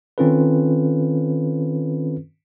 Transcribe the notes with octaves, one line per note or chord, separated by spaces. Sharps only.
D#3 C4 C#4 F4 A4 B4